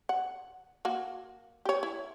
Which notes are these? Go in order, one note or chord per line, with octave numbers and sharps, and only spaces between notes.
F#5
A#3 F#4
G4 C#5
E4